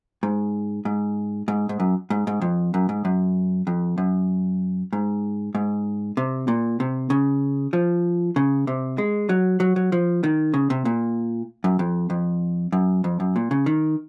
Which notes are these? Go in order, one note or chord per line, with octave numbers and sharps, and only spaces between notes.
G#2
G#2
G#2
G#2
F#2
G#2
G#2
F2
F#2
G#2
F#2
F2
F#2
G#2
G#2
C3
A#2
C3
C#3
F3
C#3
C3
G#3
F#3
F#3
F#3
F3
D#3
C#3
C3
A#2
F#2
F2
F2
F#2
F2
F#2
A#2
C#3
D#3